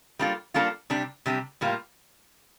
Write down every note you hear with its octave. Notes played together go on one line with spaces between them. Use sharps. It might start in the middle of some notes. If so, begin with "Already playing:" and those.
G3 A#3 D4 F4 A4
G3 A#3 D4 F4 A4
C3 G3 D4
C3 G3 D4
A2 G3 A#3 F4